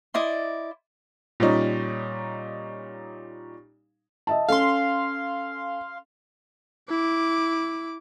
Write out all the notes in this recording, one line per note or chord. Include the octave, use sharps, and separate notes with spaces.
E4 D5 D#5 C6
A#2 G3 C#4 D#4
D#5 E5 A5
C#4 A4 F5 C6
E4 D6